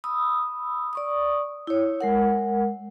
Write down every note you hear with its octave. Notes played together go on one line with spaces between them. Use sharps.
B5 D#6 E6
D5 C#6 D#6
E4 C#5
G#3 A#4 F#5